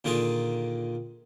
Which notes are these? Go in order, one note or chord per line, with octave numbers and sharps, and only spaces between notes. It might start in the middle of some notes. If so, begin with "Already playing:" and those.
A#2 D3 D#3 F4 G#4